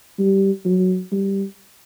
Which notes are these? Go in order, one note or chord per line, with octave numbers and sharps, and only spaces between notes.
G3
F#3
G3